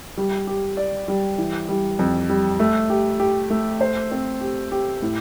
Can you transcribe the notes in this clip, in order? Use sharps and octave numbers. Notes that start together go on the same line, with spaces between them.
G3
G4
D5
G3
E3
G3
F2
G3
A3
G4
G4
A3
C5
C4
G4
G4
A2